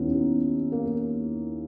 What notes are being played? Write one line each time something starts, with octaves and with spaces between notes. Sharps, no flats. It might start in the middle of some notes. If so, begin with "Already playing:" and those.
Already playing: D#2 D#3 B3 C#4 D#4 E4
B3
A#3
A#3